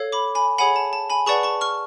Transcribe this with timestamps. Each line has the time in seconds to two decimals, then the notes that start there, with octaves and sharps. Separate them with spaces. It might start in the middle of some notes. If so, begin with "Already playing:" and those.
Already playing: A4 C#5 F5
0.12 B5 D6
0.35 G#5 B5
0.58 G#4 C#5 F#5 G#5 B5
0.76 A5
0.93 A5
1.10 G#5 B5
1.26 G#4 B4 D5 F#5 A5 C#6
1.43 A5 C#6
1.61 C#6 F6